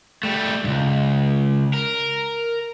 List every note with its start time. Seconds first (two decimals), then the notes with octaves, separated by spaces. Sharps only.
0.23 G3 A3
0.64 C#2 G2
1.74 A#4